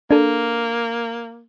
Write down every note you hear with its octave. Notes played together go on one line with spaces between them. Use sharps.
A#3 D4 A4